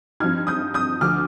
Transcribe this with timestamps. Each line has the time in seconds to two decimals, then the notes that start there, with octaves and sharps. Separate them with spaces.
0.20 G2 F3 C4 D#4 F6 G#6
0.47 D#6 G6
0.74 D#6 G6
1.01 D2 D3 F3 D6 F6